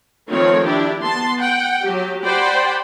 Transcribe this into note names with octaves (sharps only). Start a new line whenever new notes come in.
D#3 F3 A3 C4 C#5
D4 E4 G4
B3 A5 C6
F#5 G5
F#3 G4
G4 C5 D5 F#5 G5 B5